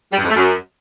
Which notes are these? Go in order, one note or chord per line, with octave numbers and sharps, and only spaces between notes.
G3
G2
F2
A3
F#2